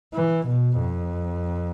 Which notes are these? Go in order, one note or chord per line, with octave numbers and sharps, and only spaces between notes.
E3
B2
F2